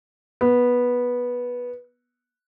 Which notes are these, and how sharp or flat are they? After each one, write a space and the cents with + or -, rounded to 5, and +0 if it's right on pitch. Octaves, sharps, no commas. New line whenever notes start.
B3 -10